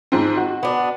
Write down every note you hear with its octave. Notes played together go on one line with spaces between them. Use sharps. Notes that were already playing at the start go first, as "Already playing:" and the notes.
G#2 F3 C4
F#4
B3 D4